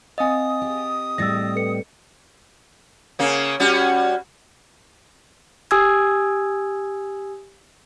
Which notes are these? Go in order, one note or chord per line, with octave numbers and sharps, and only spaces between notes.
C4 D#5 F5 G#5 D#6
G4
A2 G3 E6 A6 A#6
A4 B4 C#7
C#3 A#3 C#4
G3 C#4 F#4
G4 G#5 D#6 E6 G#6